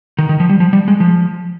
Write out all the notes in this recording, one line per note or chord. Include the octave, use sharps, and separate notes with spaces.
D#3
D#3
F3
G3
F3
G3
G#3
F3